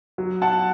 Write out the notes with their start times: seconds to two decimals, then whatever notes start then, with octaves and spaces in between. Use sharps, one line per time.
0.18 F#3
0.42 F#5 A5